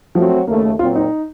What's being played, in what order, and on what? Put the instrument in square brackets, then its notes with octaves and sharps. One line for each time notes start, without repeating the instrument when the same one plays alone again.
[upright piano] F3 [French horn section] F#3 A3 C4 F#4
[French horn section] D#2 C#3 A3 [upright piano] A#3
[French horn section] A#2 F#3 C4 [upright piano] F4
[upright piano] D#4